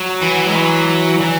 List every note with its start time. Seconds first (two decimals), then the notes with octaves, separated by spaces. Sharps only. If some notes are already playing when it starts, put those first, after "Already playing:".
Already playing: F#3
0.23 E3
0.48 G#3
0.55 F#3
1.21 E3